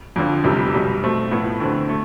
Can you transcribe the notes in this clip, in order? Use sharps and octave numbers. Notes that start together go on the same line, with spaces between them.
F2 D3 F3
F1 F2 C3 G3
B1 B2 G3
B2 A3 C4
A2 F3 B3 E4 A4
D2 D3 A3 C4
A3